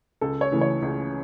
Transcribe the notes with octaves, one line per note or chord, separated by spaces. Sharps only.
C#2 A4
C#5
C#3 E3 A3
C#5
C#2